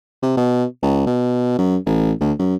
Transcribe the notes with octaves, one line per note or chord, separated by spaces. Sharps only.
C3
B2
C#2
B2
F#2
A1
D2
F#2